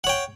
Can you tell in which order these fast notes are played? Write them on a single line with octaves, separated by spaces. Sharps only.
F#5 C#5 G5